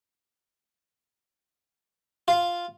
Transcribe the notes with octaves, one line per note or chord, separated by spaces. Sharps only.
F4